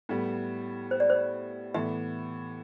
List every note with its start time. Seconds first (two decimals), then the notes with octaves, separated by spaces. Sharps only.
0.09 A2 G3 B3
0.91 C5
1.00 D5
1.10 C5
1.74 A2 E3 B3 E5